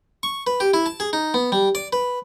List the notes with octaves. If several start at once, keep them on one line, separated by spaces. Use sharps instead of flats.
C#6
B4
G4
E4
A5
G#4
D#4
B3
G3
D5
B4